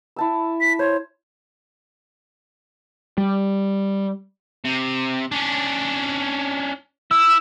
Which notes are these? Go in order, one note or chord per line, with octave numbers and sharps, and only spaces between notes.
E4 A5 E6
B6
C5 C#5
G3
C3
C#4 D4
E4 E6